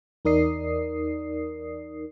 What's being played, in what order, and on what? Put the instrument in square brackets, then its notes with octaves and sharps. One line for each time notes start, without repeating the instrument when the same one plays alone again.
[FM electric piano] E2 D#4 A#4 D5 D#6 C7